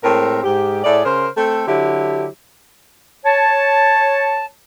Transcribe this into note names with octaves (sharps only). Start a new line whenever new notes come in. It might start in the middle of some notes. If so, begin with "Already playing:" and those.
A2 G#3 C4 A#4
G#2 G4
A2 E4 G#4 D5
C#3 A#4 C5
A3 C4 A4
D3 F#3 E4 G4
C#5 A5